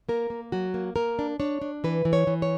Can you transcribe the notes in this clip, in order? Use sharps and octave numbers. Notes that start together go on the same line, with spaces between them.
A#3 A#4
A#3
F#3 F#4
A#3
A#3 A#4
D4
D4 C#5
D4
E3 B4
E3
C#5
E3
C#5